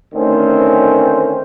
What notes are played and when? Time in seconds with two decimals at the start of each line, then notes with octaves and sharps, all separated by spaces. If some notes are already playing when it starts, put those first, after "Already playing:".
0.14 D2 D#3 A3 C4 C#4 C5